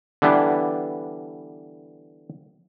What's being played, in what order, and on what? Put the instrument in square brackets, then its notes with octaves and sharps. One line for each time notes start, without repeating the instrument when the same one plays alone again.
[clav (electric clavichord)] D3 E3 G3 B3 D4